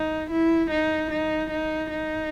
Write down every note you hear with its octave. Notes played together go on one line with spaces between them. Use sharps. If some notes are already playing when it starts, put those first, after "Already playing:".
Already playing: D#4
E4
D#4
D#4
D#4
D#4